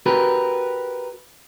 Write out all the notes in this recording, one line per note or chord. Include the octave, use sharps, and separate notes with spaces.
F#4 G4 A#4 B4